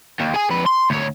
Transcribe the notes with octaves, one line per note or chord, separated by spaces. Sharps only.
D#2
G#4 G#5
F2 B4
C6
D2 C#5